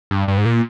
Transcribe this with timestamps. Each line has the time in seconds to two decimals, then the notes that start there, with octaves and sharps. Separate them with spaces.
0.11 G2
0.28 G2
0.38 G#2
0.45 A#2